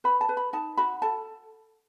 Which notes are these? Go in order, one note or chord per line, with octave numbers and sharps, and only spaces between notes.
B4 B5
A5
B4
B5
D#4 A5
F#4 B5
A4 A5